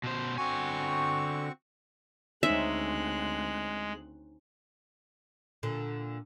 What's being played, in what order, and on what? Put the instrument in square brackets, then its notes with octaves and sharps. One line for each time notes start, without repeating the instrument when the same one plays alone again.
[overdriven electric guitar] B2 C5
[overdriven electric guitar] D3 G#5 [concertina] C4 F#4 C#6
[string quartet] D2 C4 F#6 [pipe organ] G#3 [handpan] C#4 D#4 C5 [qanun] E5
[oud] A#2 D3